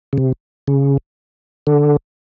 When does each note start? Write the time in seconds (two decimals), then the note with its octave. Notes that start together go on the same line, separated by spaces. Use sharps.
0.13 C#3
0.18 C3
0.68 C#3
1.67 D3